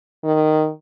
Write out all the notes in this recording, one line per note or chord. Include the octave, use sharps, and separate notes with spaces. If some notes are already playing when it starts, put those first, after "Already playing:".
D#3